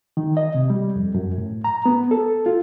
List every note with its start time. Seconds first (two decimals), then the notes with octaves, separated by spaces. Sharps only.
0.17 D#3
0.37 D#5
0.55 C3
0.70 G3
0.96 F2
1.14 F#2
1.38 A2
1.64 A#5
1.86 B3
2.11 A4
2.46 F4